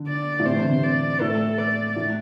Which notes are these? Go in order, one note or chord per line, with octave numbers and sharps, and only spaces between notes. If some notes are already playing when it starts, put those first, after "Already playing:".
Already playing: D3
D5
A2
C3 C5
E3
D3
C3
D5
A2 A4
D5
A2